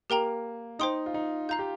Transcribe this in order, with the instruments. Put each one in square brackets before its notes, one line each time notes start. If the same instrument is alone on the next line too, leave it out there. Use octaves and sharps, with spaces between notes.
[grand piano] A#3 [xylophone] G4 A#4 G5 A#5
[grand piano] D#4 [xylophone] C5 G5 C6 D#6
[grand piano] F4
D#4
[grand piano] F4 [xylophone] F5 A#5 G6
[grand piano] G4